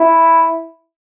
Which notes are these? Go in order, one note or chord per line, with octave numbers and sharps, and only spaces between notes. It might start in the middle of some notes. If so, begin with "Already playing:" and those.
Already playing: E4